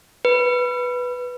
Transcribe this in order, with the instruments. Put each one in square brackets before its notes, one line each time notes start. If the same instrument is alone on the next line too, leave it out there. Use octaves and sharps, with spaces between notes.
[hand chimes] B4